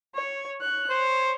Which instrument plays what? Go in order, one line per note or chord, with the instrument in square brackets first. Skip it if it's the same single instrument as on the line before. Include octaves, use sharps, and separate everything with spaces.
[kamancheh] C#5
C#5 F#6
[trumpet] C5 [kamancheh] C#5